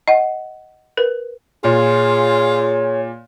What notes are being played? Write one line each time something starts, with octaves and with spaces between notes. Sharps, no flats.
D#5 F#5
A#4 B4
A#2 F4 G#4 C#5